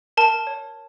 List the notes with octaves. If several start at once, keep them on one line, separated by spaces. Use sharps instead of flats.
A#4 A5
C#5